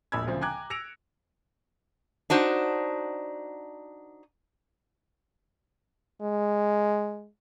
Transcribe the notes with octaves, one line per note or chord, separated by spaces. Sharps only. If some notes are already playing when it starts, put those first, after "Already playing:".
E1 A#1 A#2 B5 E6 G#6
D2 C#3 F3 C4
G5 G#5 A#5 D6 F#6 G#6
E6 A#6 C#7 D7 F7
D4 D#4 F#4 C5
G#3